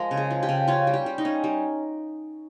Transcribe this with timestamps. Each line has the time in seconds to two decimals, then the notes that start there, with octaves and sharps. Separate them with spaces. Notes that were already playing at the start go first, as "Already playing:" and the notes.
Already playing: F3 G#3 A#4
0.11 C#3
0.17 G#4
0.31 F3
0.43 G4
0.49 C#3
0.68 C#4 F4
0.87 G3
0.94 G4
1.06 G3
1.18 D#4
1.25 C#4
1.44 G3